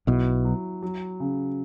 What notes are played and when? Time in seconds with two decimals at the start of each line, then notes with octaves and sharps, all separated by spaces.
0.07 B1 B2 E4
0.45 F#3
0.83 F#3
1.20 C#3